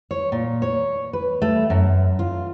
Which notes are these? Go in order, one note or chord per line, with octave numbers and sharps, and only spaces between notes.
C#5
A#2
C#5
B4
A3
F#2
F4